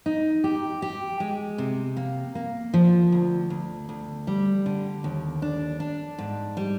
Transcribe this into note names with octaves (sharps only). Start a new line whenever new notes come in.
D#4
G4
G4
G#3
C3
A#3
A#3
F3
D2
D2
D2
G3
D3
D#2
D4
D4
G#2
G3